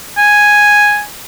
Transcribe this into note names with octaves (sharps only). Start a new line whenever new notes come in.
G#5